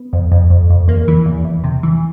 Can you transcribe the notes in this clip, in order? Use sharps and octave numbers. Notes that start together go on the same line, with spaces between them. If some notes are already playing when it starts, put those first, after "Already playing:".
Already playing: B3
F2
F2
F2
F2
E2 A#3
E3
E2
E2
C3
E3